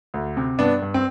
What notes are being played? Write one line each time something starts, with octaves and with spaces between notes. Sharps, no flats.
D2
C3
G2 B3 D4
G2
C4